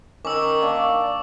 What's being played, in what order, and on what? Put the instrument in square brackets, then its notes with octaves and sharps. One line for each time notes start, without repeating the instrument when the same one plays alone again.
[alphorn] D#3 [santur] C#4 [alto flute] A#4 [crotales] D6 E6
[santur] A#3 D4 C#6 [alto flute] D5